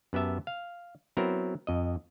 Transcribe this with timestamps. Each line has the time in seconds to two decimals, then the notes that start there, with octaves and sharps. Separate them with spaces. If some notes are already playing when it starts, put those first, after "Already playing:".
0.13 F#2 B3 G4 E5 A5
0.47 F5
1.17 F#3 B3 C4 E4 A#4
1.67 F2 D#5